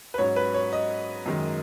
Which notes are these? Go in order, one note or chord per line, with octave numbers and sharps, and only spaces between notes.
B4
G#2 F#3 C#4 C#5
B4
C#5
D#5
F#2 D#3 G#3